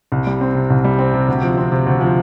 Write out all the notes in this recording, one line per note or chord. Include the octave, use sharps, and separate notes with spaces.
C2
G3
C4
C3
C2
G3
C4
C3
D2
F3
C4
C3
D2
F3